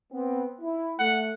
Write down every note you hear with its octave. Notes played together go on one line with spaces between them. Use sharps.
B3 C4
E4
A3 F#5